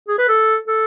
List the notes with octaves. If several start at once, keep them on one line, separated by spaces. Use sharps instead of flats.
G#4
B4
A4
A4